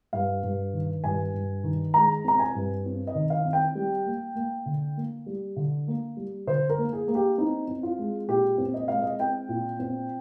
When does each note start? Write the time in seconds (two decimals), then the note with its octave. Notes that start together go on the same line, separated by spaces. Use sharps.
0.13 G2 F5
0.43 G2
0.73 D#3
1.04 G2 G#5
1.34 G2
1.64 D#3
1.94 G#3 A#5
2.24 C4 A#5
2.39 G#5
2.55 G2
2.86 C4
3.07 D#5
3.15 D#3
3.30 F5
3.45 C4
3.53 G5
3.75 G3
4.06 A#3
4.35 A#3
4.66 D3
4.97 A#3
5.26 G3
5.56 D3
5.88 A#3
6.17 G3
6.47 D3 C5
6.70 A#4
6.78 A#3
6.93 G#4
7.08 A#3
7.15 G4
7.38 C4 D#4
7.68 C4
7.83 F4
7.99 G#3
8.28 A#2 G4
8.58 C4
8.74 D#5
8.88 G#3 F5
9.02 D#5
9.19 C4 G5
9.49 A#2
9.79 C4